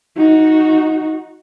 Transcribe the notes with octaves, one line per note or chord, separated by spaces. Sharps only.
D#4 F#4